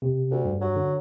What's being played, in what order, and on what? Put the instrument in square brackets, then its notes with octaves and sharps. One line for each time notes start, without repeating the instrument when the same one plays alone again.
[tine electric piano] C3
[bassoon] D2
[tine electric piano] G2
[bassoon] F#3
[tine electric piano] D3